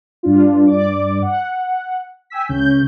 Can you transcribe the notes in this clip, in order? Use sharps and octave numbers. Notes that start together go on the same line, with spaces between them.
G2 D4 F4
G2 D5 D6
F#5
G5 G#5 E6 B6
C#2 C#3 C#4 G6